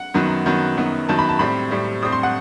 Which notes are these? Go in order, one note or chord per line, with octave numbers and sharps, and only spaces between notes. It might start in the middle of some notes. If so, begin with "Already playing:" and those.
Already playing: F#5
F#2 D#3 F#3 B3
F#2 D#3 F#3 B3
F#2 D#3 F#3 B3
F#2 D#3 F#3 B3 A5
B5
A5
A2 G3 C4 B5
A2 G3 C4
A2 G3 C4 D#6
C6
F#5